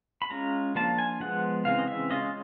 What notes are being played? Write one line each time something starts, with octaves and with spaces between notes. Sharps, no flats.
B5
G#3 C#4 F4 A#5
F3 A#3 D4 F4 A5
G#5
F3 G#3 B3 F#5
C#3 E3 G#3 C4 F5
D#5
E5
G#3 C#4 F4 D#5